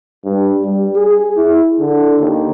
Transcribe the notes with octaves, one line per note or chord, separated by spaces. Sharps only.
G2
G3
G#4
E4
D3
D#2